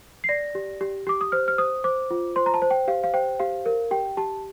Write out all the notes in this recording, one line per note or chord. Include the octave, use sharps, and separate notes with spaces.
C7
D5 A#6
G4
G4
G4 D6
D#6
C5 F6
F6
C5 D#6
C5 D6
F4
C5 C6
A#5
A5
C5
G5
G4 F5
F5
C5 G5
G4 F5
A#4
G4 G5
G4 A5